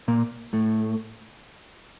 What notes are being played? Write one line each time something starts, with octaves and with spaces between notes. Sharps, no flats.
A#2 A#3
A2 A3